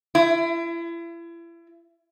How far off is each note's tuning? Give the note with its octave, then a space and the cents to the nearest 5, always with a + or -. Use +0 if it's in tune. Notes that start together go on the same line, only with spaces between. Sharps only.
E4 +35